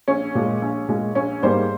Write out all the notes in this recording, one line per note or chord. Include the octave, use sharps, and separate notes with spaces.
A#1 C#4
A#2 G#3
A#1
A#2 G#3
A#1 C#4
G#2 G3 A#3 G#4 C5